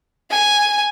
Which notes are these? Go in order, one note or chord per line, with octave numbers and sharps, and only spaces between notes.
G#5